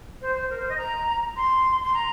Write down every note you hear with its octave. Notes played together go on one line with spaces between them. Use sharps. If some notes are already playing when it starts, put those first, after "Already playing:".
C5
C5
A#4
C5
D#5
A#5
C6
C6
A#5